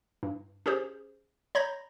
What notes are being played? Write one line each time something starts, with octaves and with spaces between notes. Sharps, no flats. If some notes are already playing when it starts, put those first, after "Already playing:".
G2
C#4 G4 G#4 C5
C#5 A#5 B5 G6 A#6